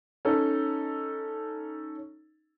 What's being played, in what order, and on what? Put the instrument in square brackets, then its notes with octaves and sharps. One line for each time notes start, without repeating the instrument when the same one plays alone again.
[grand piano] C#4 D#4 A4